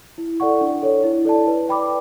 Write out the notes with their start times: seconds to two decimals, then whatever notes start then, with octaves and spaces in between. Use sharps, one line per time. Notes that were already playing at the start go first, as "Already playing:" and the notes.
0.18 E4
0.40 A4 D5 F#5 C#6
0.61 D4
0.82 A4 C#5
1.03 E4
1.25 A4 D5 A5
1.47 B4
1.68 D5 G5 B5 D6